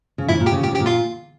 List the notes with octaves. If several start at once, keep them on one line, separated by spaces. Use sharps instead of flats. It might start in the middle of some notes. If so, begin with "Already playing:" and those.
C#3
A#2 E4 E5
C#3
A#2
G4 G5
C#3
A#2 G4 G5
C#3
G4 G5
A#2
F4 F5